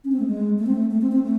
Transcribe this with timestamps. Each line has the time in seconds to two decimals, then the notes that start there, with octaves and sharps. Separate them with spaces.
0.05 C#4
0.12 C4
0.20 A3
0.27 G#3
0.59 A3
0.67 C4
0.75 A3
0.91 A3
1.02 C4
1.12 C4
1.23 A3